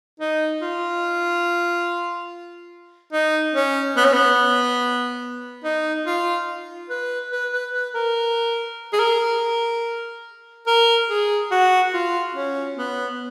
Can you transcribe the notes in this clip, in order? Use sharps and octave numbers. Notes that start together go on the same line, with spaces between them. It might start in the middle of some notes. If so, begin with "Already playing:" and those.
D#4
F4
D#4
C#4
B3
C#4
B3
D#4
F4
B4
B4
B4
B4
A#4
G#4
A#4
A#4
G#4
F#4
F4
C#4
B3